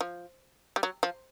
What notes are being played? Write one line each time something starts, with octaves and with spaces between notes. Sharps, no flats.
F3
G3
F#3
F3